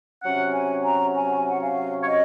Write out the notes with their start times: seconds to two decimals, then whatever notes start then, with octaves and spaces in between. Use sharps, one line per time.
0.23 C3 F#3 C#4 F#5
0.53 G#5
0.85 A#5
1.16 G#5
1.50 F#5
1.62 F5
2.03 C#5
2.08 D#5